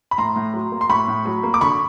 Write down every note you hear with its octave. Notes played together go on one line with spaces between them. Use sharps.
B5
A2 A#5 C6
A2
F#3
A#3
C6
A2 B5 C#6
A2
F#3
A#3
D6
D3 B5 C#6